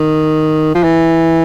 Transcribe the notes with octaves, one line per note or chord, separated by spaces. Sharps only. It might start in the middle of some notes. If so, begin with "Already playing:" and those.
Already playing: D#3
F3
E3